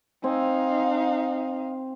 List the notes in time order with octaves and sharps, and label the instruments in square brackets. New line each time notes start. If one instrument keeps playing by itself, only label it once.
[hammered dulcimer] C4 G#5 [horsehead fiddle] D#4 F5